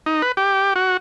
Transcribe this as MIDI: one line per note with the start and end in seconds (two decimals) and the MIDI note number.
0.06 0.22 63
0.22 0.32 71
0.37 0.74 67
0.76 0.97 66